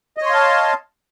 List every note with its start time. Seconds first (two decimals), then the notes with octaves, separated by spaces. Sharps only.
0.17 D#5
0.22 C#5
0.26 C6
0.30 F5
0.34 A5